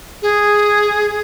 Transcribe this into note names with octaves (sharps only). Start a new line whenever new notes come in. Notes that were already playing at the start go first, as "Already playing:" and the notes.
G#4